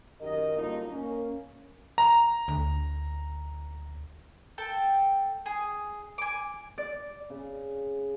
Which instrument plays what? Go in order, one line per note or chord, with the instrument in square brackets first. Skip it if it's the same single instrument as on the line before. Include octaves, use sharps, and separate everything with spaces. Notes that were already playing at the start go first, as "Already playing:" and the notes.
[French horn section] F#2 D#3 G4 A#4 D#5
F#2 D3 G3 A#3 D#4 F4
A#3 C#4
[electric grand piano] A#5
[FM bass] D2
[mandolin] A4 G5 A5
G#4
G#5 D6
[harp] D5
[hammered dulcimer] C#3